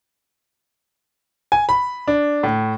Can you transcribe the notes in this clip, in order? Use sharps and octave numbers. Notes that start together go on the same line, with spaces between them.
G#5
B5
D4
A2